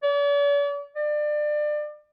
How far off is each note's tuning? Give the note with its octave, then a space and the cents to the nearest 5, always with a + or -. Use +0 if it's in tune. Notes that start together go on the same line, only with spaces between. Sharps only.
D5 -45
D5 +30